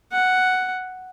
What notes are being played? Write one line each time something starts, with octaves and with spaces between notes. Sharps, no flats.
F#5